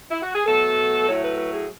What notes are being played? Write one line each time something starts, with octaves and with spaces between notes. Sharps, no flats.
E4
F#4
G#4
B2 F#3 A3 A4
A2 F#3 A3 C#5
B4
B4
G#4